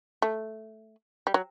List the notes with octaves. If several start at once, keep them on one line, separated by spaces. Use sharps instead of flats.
A3
G3
F#3